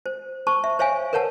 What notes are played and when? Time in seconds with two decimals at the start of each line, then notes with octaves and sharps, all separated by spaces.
0.06 C5
0.47 C5 A5 C#6
0.64 E5
0.79 C5 C#5 E5 F5 G#5
1.13 A#4 B4 C#5 F#5 A5